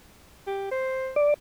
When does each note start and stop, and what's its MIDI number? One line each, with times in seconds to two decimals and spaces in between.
0.47 0.69 67
0.71 1.12 72
1.16 1.34 74